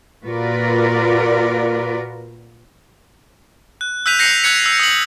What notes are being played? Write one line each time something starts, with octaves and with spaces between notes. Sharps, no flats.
A#2 F4 F#4 A#4 B4 D5
F#6
E6 F#6 G6 B6 D#7 F7
G6 A#6 C7 C#7 F7
E6 F#6 G#6 C#7 F7
E6
D#6 F#7